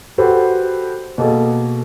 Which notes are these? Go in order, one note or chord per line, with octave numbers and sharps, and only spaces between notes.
F#4 G4 A4 B4 C5 F#5
B2 A#3 G#4 A4